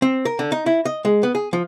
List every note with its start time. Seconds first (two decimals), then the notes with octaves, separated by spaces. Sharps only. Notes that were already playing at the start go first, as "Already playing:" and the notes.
0.02 C4
0.25 A#4
0.39 D3
0.52 D#4
0.66 E4
0.85 D#5
1.05 G#3
1.23 B3
1.35 G#4
1.53 F3